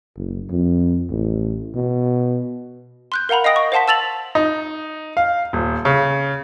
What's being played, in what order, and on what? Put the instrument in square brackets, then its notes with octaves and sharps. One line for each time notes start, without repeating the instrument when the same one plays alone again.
[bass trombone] F#1
F2
A1
B2
[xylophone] C6 F#6 G6
A#4 F5 F#5 A#5 B5
D#5 F5 G5 D#6 A#6 D7
C#6
C5 F5 F#5 A5 C6 B6
A5 E6 A6 F7 F#7
[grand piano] D#4
F5
D#1
C#3